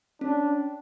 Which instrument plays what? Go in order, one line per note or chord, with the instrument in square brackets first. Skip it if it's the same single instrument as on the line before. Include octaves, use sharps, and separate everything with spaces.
[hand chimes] C#4 [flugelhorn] D4